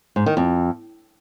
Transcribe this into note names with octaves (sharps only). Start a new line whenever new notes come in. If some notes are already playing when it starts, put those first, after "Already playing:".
G#2
D#3
F2